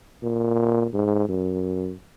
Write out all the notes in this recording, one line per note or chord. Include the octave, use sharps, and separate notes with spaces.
A#2
G#2
F#2